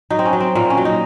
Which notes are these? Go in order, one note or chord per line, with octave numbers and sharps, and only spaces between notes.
F#3 D#4
C4
C#4
F#3
C4
A#2 A#3
C#4
F#3
D#4